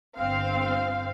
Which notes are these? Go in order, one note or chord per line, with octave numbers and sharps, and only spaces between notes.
G1 C4 F5